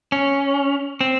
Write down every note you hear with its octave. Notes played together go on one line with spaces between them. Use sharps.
C#4
C4